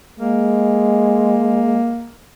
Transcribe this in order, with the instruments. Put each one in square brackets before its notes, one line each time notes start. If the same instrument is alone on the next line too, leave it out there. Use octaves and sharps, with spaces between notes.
[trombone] G#3 [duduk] A#3